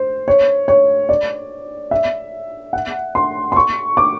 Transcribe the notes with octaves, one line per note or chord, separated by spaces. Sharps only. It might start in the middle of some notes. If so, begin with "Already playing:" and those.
Already playing: C5
C#5
C#5
D5
E5
F#5
C6
C6
C#6
D6